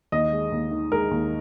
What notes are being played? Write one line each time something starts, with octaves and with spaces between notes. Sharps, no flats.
D#2 D#5
G#3
D#2
D#3
G#3 A#4
D#2